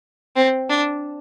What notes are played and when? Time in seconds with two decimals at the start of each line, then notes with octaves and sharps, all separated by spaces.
0.36 C4
0.69 D4